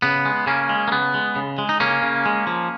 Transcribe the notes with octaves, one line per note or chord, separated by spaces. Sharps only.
C#3 B3
G#3
C#3 A#3 C#4
G#3
A#3
C#3 B3
G#3
C#3
G#3
D#4
C#3 A#3 C#4
C#3
G#3
F3